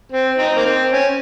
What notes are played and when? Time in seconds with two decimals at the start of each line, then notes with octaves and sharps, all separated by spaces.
0.12 C4
0.39 C4 D#4
0.56 A#3
0.65 C4
0.92 C#4